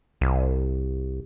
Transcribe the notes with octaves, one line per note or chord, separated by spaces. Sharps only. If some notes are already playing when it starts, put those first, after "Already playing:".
C2